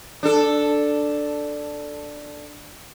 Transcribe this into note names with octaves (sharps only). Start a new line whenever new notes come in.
D4 A4